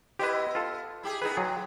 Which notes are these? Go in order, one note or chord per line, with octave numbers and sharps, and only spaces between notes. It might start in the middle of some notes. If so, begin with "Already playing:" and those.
B3 E4 G4 B4 D#5
F4 A4
E4 G4 G#4
B3 D#4 E4 G#4 B4
A2 F#3 G#4